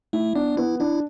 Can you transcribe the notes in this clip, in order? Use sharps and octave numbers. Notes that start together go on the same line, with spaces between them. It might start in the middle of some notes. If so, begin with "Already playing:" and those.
A3 E4
B3 D4
B3 E4
D4 E4